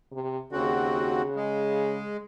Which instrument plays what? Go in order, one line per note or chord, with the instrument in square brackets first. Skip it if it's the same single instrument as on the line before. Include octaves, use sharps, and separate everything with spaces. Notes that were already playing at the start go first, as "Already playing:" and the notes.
[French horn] C3
[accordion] D#2 C4 F#4 [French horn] C#3
[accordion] G#3